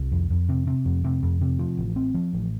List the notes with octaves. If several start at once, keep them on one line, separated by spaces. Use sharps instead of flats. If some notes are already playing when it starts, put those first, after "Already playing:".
Already playing: C2
F2
F2
C3
C3
F2
C3
F2
C3
F3
A1
C4
F3
A1